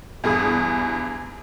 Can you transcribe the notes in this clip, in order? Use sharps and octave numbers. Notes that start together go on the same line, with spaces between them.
E2 G2 G#4 D#6